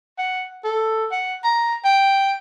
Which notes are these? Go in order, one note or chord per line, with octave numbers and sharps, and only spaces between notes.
F#5
A4
F#5
A#5
G5